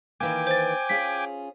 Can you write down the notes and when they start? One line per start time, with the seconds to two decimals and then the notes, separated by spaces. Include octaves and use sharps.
0.20 D#3 E3 A#3 G5 G#5 D6
0.47 C5 A6
0.89 C#4 F4 G#4 B6